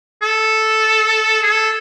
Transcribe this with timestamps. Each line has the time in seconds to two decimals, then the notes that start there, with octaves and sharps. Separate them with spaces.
0.22 A4
1.43 G#4
1.51 A4